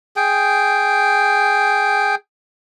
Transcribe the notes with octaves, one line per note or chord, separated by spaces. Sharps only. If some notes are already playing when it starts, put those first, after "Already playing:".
G#4 G5